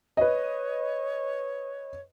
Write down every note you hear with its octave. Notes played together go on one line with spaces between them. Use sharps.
B4 C#5 D#5